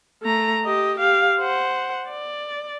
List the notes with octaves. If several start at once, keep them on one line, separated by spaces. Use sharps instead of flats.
A3 A#5
G4 D#5
G4 F5
C5 F#5
D5